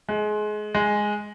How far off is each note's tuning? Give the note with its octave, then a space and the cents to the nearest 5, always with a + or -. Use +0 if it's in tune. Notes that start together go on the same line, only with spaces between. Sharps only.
G#3 +25
G#3 +0